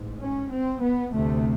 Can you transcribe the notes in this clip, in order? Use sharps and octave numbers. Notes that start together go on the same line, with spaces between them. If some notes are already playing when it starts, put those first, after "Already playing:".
Already playing: A1 G#2
C#4
C4
B3
D2 C3 A3